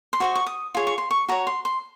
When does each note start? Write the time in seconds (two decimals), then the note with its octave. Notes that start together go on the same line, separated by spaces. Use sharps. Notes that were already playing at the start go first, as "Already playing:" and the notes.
0.13 C6
0.20 F#4 C5 D#5 C#6
0.36 C#6
0.47 D#6
0.75 F4 G#4 C#5
0.87 C#6
0.98 C6
1.11 C#6
1.29 F#4 C#5 A#5
1.47 C6
1.65 C6